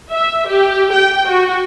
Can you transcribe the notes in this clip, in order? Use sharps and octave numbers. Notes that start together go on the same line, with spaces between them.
E5
G4
G5
F#4